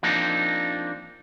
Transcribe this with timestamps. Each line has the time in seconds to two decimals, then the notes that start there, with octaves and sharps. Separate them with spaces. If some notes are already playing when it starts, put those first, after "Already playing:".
0.03 F3 A#3 C4 D4 D#4